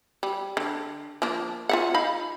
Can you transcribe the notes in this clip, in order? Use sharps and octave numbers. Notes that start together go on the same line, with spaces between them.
G3
D3
F3 A#3 D4
F4 E5 F#5
D#4 F5 B5